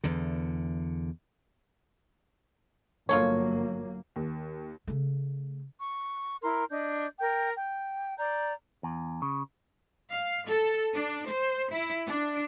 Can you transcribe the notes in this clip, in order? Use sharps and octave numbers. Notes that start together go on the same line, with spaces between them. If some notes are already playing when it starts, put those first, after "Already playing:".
E2 D3
G1 F#3 A#3 F4 A4 C#5
D#2
C#3 A3
C#6
E4 A#4 C6
D4 D#5 G6
A#4 G5
G5
D5 A#5 G6
E2
C#3
F5
A4
D4
C5
E4
D4